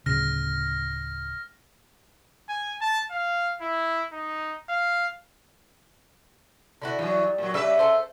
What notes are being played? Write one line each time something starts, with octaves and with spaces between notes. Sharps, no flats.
D1 C#3 F6 A#6
G#5
A5
F5
E4
D#4
F5
D3 E4 F#4
E3 F#3 G3
A#2 F#3
C#3 G3 B4 E5
A4 C5